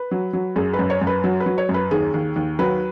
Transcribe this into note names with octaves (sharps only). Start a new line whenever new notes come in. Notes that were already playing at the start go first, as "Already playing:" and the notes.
Already playing: B4
F#3
F#3
F#2 G#4
B4
F#2
C#5
F#2
B4
F#3
B4
F#3
C#5
F#2
B4
D#2 G#4
D#2
D#2
F#3 B4